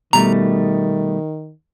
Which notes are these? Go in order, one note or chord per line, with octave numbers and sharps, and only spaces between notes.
B2 D#3 G3 A3 A#5